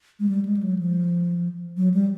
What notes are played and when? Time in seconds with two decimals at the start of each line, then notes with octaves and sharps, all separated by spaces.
0.20 G#3
0.29 G3
0.45 G#3
0.57 G3
0.62 F#3
0.78 F3
1.77 F#3
1.94 G3